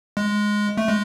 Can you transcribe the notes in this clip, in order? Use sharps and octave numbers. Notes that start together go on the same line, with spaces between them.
G#3
A3
G#3